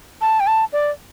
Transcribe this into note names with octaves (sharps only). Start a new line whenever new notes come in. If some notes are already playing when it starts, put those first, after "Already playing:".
A5
G5
A5
D5